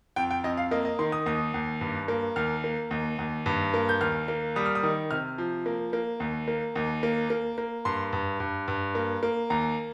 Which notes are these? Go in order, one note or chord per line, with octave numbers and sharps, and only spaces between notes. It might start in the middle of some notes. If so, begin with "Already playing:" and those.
F2 G5
G5
F2 D#5
F5
A#3 D#5
D#5
D#3 C6
D#6
D#2 D#6
D#2
G2
A#3
D#2 F6
A#3
D#2
D#2
G2
A#3
G6
D#2 F6
A#3
G3 D#6
F6
D#6
D#3
C3 F6
F3
A#3
A#3
D#2
A#3
D#2
A#3
A#3
A#3
G2 C6
G2
G2
G2
A#3
A#3
D#2 A#5